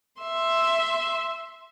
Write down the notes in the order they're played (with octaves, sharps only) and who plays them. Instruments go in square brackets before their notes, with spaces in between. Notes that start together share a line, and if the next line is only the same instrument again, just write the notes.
[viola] E5 C6